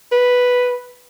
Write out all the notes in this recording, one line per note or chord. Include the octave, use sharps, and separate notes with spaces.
B4